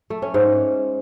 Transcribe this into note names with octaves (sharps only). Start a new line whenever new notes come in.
A3
C#4
G#2